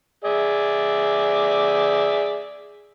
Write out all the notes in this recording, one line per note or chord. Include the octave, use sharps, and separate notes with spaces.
G#4 D5 E5